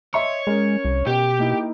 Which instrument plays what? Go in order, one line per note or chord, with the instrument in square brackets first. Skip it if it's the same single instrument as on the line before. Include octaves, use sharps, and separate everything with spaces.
[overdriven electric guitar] C#5 [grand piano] D#5 E5 C6
[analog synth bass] G#3 [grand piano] C#4 A#4
[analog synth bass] C2
[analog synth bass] B2 [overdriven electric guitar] G4
[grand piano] A#3 D#4 E4